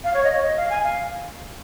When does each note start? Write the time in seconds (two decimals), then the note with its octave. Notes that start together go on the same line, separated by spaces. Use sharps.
0.04 F5
0.14 C#5
0.24 D#5
0.34 C#5
0.43 D#5
0.57 F5
0.70 G#5
0.83 F5